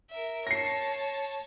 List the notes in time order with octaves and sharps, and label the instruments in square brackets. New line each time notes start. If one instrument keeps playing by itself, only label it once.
[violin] A#4 E5
[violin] C#5 A5 [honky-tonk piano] A#6 C7